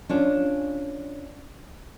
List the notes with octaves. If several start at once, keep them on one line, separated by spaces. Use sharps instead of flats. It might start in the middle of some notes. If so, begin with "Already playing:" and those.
C#4 D4 F4